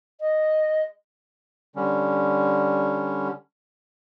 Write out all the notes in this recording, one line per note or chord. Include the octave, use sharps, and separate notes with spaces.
D#5
D3 G3 C#4